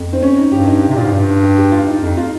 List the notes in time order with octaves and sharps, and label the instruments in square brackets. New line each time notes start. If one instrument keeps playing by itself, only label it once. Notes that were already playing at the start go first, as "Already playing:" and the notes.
Already playing: [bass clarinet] F2
[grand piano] C4
C#4
D#4
[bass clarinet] G2 [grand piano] G4
[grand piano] D#4
G4
[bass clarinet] C3
[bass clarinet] A#2 [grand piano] F4
[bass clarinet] G#2
G2
[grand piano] G4
G4
F4
D#4
[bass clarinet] F2 [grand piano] D#4
[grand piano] F4